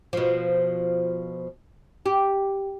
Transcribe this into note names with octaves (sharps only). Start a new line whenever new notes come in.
B2 F3
G4